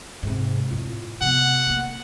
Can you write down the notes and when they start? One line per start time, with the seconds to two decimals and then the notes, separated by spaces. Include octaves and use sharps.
0.23 G#2 C3
0.71 A2 F4
1.21 C3 B3 F#5
1.67 A3 A#3